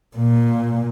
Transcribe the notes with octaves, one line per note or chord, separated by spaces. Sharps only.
A#2